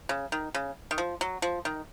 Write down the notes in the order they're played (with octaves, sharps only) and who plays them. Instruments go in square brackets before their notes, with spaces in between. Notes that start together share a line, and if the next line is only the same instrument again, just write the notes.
[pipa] C#3
D#3
C#3
D#3
F3
F#3
F3
D#3